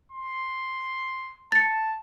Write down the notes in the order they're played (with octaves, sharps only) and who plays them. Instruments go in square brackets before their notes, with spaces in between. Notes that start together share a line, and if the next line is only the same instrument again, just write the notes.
[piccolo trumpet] C6
[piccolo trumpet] A5 [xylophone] A6 C#7